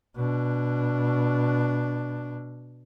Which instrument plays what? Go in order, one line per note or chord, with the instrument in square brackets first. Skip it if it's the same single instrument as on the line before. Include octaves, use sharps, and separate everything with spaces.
[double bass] B2 D4